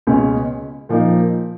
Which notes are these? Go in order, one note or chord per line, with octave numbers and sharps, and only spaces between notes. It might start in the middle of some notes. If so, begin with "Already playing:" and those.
C#2 B2 G#3 C#4
A#2 F3 A#3 D#4